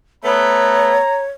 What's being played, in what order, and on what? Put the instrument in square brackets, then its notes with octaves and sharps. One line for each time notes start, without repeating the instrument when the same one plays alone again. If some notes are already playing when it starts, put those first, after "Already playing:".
[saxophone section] A3 B3 [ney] C#5 [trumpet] A#5